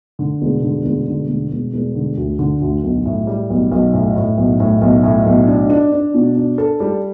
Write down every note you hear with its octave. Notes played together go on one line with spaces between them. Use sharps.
D3
E1
D3
E1
D3
E1
E1
E1
D3
D2
D3
D2
B1
A2
G3
B1
B1
A2
A2
B1
A2
B1
A2
B1
D4
D4
D4
B2
D4
A4
G3